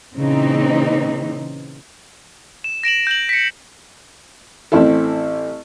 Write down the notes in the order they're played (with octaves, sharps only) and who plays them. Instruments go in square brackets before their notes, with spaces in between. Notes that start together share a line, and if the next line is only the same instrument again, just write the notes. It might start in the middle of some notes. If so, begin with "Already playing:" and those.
[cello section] A#2 C#3 E3 C4 D#4
[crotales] E7
A#6 D7 E7 F#7
G6 F#7
B6 C#7
[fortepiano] A1 C4 E4 A4